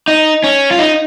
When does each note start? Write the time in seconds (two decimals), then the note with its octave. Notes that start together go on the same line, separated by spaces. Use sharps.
0.08 D#4
0.44 C#4
0.71 F4
0.79 D#4